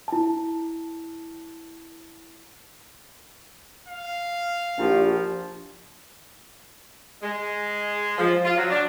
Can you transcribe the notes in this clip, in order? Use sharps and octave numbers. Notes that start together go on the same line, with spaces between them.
E4 A5
F5
A#1 F3 D4 E4 G4
G#3
F3
F4
F#3
D4